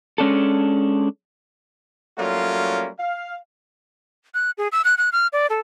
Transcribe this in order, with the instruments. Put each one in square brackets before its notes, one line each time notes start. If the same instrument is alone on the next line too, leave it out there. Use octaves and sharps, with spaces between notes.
[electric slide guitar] G#3 C#4 D4 A4
[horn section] F#3 G3 A3 A#3 C#4 F4
F5
[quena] F#6
G#4
E6
F#6
F#6
F6
D5
A4